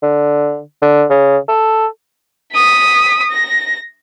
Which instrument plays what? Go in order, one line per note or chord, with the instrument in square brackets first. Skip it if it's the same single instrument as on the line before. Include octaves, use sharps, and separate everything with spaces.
[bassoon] D3
D3
C#3
A4
[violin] D#6 B6
A#6